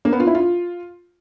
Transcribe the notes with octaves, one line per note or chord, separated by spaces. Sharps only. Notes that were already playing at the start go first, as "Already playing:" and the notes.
A#3
B3
F4
E4
F4